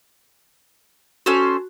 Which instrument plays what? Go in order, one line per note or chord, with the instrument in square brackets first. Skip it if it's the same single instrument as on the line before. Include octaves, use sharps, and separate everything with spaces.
[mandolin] C#4 A4 C5 [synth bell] F#4